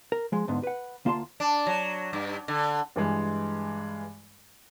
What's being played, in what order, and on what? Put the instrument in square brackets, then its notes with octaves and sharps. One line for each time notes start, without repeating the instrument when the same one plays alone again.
[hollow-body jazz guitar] A#4
F3 G#3
D2 G#2 D3 B3
B4 F#5
D2 A#3 F4 E5 A5 C6
[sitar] D4
F#3
G2
D3
[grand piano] G2 E3 G#3